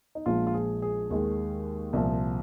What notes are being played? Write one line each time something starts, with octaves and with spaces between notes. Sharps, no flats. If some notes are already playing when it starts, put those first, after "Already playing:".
D#4
A#1 A#2 F3 G#3 F4
F4
G#4
G#4
D#2 D#3 G#3
C2 A#2 F3